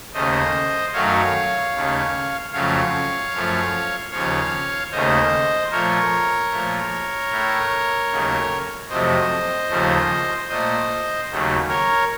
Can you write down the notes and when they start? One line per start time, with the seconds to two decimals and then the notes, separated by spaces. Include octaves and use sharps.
0.13 D#2 C#3 A3 C5 D#5
0.93 F#2 D#3 F#3 A3 C#5 F5
1.73 D#2 C#3 A3
2.52 F2 C#3 F#3 A3 C#5 F5
3.32 F#2 F3 A3
4.11 D#2 C#3 F3 C#5 F5
4.92 D#2 C#3 A3 C5 D#5
5.71 A#2 F3 A3 A#4 C#5
6.50 A#2 F3 A3
7.31 A2 A3
8.09 D#2 C#3 F#3 A3
8.89 F2 C3 F#3 A3 C5 D#5
9.69 D#2 C#3 F3 A3
10.48 A#2 A3 C5 D#5
11.29 D#2 C#3 F#3 A3
11.68 A#4 C#5